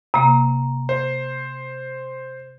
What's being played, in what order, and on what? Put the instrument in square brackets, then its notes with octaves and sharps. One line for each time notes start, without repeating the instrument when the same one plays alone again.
[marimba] C3 A#3 [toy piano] A#5
[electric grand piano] C5